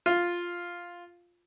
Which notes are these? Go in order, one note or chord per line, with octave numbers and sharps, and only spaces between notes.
F4